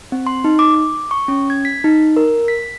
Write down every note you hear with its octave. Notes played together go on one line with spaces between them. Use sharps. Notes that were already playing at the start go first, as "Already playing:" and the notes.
C4
C6
D#4
D6
D6
C#6
C#4
G#6
B6
D#4
A#4
B6